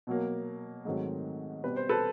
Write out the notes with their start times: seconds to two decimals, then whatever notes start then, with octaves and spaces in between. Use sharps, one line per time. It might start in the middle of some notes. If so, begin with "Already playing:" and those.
0.07 B2 F#3 A#3
0.85 G#2 D#3 F#3 A3 C4
1.63 B2 G3 C4 B4
1.76 C5
1.89 A4 B4